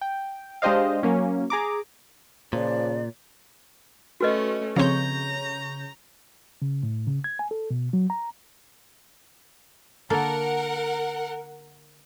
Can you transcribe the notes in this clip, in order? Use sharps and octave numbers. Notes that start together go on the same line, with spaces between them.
G5
G#3 D4 G4 C5 D#5 F5
F#3 A#3 C#4
G#4 A#5 D6
A#2 C#3 F3 D5
A3 C#4 F#4 B4 D#5
C#3 F3 C4 C#5 A#5 G6
C#3
A2
C#3
G#6
G#5
A4
B2
F#3
A#5
D3 A#3 A4 A#4 F#5